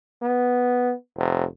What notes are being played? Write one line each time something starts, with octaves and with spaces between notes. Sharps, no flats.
B3
F1